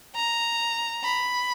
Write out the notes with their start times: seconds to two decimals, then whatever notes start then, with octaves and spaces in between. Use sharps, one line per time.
0.16 A#5
1.03 B5